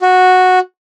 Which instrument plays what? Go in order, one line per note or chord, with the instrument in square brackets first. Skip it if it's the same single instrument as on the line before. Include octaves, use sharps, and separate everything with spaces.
[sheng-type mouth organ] F#4